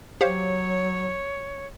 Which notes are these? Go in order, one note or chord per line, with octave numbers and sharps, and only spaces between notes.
F#3 G4 C5 C#5 F5